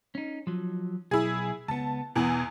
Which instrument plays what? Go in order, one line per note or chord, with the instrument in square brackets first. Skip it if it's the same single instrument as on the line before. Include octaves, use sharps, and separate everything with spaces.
[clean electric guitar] C#4 D#4
F3 F#3
[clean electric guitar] B1 [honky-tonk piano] E4 G#4
[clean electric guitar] C#2 B3 [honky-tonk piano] A5
[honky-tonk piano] E2 E3 G#5 [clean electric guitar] B2 B3 F#5